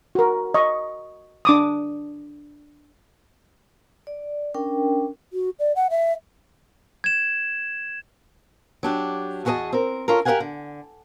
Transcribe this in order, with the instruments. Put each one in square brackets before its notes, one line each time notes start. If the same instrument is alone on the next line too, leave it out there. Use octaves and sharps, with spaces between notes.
[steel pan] F#4 A#4
D#5 C#6
D4 D6 D#6
[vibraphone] D5
C#4 D4 A#4 G5
[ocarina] F#4
D5
F#5
E5
[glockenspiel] G#6 E7
[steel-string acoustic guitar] F#3 D4 G4
E2 F#4 G#4 B4 D#5 A5
C4 A#4
C#4 F4 A4 A#4
G4 A#4 C#5 F5 F#5 G#5
D3